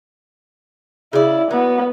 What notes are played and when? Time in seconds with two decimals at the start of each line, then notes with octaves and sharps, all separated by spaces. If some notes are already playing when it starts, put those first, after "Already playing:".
1.13 C#3 E4 D5
1.51 F#3 B3